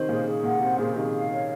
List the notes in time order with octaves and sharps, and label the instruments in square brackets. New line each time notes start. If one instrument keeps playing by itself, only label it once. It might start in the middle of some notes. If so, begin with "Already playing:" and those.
Already playing: [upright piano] C3 D#3 [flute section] C5
[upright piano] A#2 C#3 [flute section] G#4
[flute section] G#4
[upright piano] A#2 [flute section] F#5
[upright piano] C3 [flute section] C5
[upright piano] A#2 C#3 [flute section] G#4
[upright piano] C3 D#3 [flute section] G#4
[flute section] F5
C#5